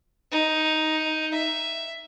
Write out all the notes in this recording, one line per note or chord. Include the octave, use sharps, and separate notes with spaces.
D#4
E5